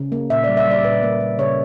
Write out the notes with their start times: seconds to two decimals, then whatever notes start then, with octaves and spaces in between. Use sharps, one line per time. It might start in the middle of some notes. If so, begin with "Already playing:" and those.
Already playing: C#3
0.12 A#3
0.30 A#2 E5
0.44 G3 D5
0.57 E5
0.66 G3 D5
0.84 A#2 B4
1.03 A#3
1.20 A#3
1.39 C#3 C#5